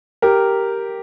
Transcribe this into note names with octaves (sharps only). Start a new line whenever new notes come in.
G4 A#4